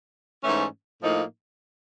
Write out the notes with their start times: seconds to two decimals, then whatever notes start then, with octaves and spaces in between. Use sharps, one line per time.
0.44 G#2 E3 A3 C#4
1.02 A2 F3 A#3 D#4